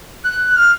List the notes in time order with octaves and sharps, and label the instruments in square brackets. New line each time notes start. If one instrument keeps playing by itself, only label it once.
[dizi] F#6
F6